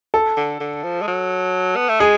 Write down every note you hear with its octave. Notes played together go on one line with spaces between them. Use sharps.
A4
D3
D3
F3
G#3
F#3
B3
A3
G#3 G#4